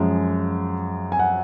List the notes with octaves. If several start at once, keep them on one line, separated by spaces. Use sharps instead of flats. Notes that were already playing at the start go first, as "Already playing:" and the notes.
Already playing: F#2 F3 G#3
G#5
F#5